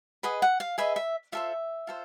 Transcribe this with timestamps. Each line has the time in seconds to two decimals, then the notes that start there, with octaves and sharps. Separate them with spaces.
0.23 G#4 B4 D#5 F#5
0.42 F#5
0.60 F5
0.78 G#4 B4 D#5 E5
0.96 E5
1.32 F4 A4 C5 E5
1.87 F4 A4 C5